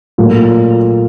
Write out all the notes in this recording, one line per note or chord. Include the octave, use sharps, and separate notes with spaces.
A#2 F#3 A3